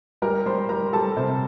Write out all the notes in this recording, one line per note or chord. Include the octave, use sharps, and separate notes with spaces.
G3 A#4 A#5
G3 C5 C6
G3 A#4 A#5
G3 A4 A5
C3 C5